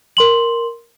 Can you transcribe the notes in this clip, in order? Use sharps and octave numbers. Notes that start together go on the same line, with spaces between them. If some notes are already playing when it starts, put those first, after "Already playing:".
A#4 C6 F#7